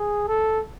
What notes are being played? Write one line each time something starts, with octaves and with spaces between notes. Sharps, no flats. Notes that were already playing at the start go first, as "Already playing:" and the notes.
Already playing: G#4
A4